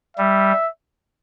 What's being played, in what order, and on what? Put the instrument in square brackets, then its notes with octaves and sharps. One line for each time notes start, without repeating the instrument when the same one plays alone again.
[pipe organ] G3 [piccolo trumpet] E5